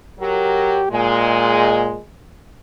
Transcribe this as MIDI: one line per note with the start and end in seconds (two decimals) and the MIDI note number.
0.19 0.82 54
0.19 0.86 67
0.19 0.82 70
0.91 2.00 46
0.91 1.99 56